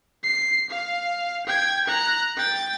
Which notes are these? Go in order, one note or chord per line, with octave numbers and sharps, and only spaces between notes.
C7
F5
G5 G#6
A#5 F#6
G5 A6